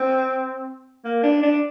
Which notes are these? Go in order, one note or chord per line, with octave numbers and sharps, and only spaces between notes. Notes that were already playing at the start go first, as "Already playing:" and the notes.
Already playing: C4
A#3
D4
D4